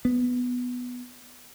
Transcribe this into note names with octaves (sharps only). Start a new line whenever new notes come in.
B3